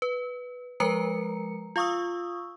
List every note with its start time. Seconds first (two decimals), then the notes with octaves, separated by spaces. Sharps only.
0.02 B4
0.80 F3 G#3 A#4 B4 A#5 C#7
1.76 F4 F5 C#6 D#6 E6